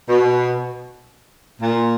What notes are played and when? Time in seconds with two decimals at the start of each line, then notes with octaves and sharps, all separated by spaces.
0.08 B2
1.60 A#2